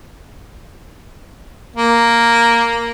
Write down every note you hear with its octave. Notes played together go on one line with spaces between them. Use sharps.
A#3